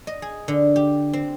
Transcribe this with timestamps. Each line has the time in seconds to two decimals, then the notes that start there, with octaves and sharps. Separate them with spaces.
0.07 D#5
0.22 G#4
0.48 D3
0.76 G4
1.13 C4